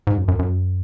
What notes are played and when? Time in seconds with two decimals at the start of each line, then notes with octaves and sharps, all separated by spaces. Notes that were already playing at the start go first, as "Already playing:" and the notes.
0.07 G#2
0.17 F#2
0.28 F#2
0.39 F#2